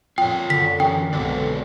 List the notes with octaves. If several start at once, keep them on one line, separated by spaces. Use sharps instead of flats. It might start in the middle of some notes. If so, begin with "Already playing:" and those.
F2 A#2 F4 C#5 G5
F#2 D3 B6
E3 C#4 G5
B1 B2 D3 G#3 C4 D5